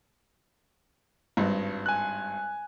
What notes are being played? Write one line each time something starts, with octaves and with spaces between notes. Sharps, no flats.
G#1 G2
G#5 F#6